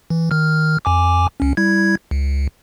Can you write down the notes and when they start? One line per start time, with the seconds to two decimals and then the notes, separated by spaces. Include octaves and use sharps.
0.10 E3
0.31 D#3 F6
0.85 F2 G#5 D6
1.40 C#2 C#4
1.57 G3 E4 G#6
2.11 C#2